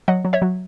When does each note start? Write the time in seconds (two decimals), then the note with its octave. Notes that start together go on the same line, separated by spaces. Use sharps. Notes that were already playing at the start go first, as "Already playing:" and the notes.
0.08 F#3 D#5 F#5
0.25 F#3
0.33 C#5 E5
0.42 F#3